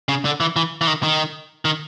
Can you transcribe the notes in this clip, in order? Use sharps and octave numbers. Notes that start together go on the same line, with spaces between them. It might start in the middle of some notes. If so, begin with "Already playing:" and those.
C#3
D3
E3
E3
E3
D#3
D#3
D#3